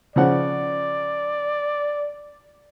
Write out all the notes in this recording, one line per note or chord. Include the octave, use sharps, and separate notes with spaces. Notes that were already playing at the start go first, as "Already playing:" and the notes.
C#3 F3 D5 F#5